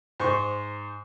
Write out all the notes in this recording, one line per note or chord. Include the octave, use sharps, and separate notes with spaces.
G#2 C5 C#6